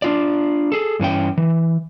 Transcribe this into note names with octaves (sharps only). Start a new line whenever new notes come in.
D4 F4 D5
G#4 A4
G2 E3 C#4 G5
E3